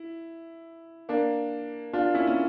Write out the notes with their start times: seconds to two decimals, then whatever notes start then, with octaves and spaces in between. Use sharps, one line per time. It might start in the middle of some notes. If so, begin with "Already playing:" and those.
Already playing: E4
1.09 A#3 D4
1.93 D4 F4
2.14 C#4 E4
2.27 C#4